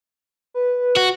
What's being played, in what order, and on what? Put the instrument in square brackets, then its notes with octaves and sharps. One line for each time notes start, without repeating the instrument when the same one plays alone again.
[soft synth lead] B4
[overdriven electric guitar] F#4